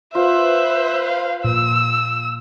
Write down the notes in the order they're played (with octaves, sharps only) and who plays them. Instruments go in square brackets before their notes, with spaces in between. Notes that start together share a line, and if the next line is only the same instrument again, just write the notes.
[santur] F4 [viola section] B4 C5 [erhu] E5
[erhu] F5
[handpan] A#2 [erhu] E6